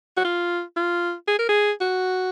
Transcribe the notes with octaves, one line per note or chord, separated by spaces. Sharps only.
F#4
F4
F4
G#4
A#4
G#4
F#4